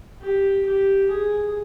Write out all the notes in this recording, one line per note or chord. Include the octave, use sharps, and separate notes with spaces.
G4
G4
G#4